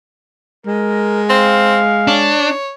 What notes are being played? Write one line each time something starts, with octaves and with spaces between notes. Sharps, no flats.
G#3 A#4
C4 F5
D4 C#5